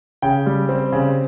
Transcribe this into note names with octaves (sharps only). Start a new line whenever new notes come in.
C#3 G5
G3
C4
C#3